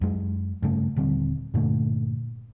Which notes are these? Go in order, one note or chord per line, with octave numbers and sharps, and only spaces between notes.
F#2 G#3
G2 C#3 A3
D#1 D3 G3 C4
G2 A#2 D3 A3